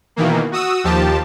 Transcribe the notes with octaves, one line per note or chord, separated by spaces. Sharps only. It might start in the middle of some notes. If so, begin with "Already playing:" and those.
B2 D#3 E3 A#3
F#4 D#6 E6
D#2 F3 G4 A5